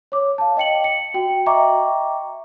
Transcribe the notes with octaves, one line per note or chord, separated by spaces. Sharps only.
C#5 D6
F5 A5
D#5 G5 C#7 F#7
C#7
F#4 G5
D#5 E5 G5 A#5 C#6 D6